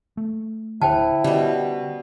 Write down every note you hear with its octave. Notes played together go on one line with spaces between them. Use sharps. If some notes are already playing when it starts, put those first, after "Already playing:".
A3
D1 D3 E4 C5 G5 A5
B2 D3 G3 C#4